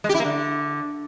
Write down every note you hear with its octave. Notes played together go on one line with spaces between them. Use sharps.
G#3
G4
E4
A#3
D3